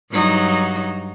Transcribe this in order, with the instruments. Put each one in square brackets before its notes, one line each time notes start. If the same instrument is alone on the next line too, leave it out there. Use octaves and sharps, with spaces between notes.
[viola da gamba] G2 F#3 D#4